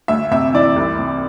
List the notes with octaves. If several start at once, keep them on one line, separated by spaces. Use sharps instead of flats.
D2 E5
C3 E5
E3 D5
C2
C3